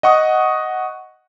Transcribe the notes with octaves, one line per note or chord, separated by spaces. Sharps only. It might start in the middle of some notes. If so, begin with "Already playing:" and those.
D#5 F#5 C#6 D#6